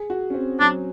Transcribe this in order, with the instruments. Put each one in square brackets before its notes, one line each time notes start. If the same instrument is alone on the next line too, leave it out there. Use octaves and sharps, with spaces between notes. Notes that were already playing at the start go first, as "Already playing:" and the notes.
Already playing: [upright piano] G#4
F#4
C#4
C4
[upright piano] F#3 [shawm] D4